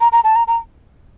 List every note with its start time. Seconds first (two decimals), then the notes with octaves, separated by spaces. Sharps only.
0.01 A#5
0.12 A#5
0.24 A5
0.35 A#5
0.47 A#5